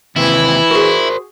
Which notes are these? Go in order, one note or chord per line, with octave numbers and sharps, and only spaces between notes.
D#2 C3 E3 E4
F#4 G#4 A#4 C5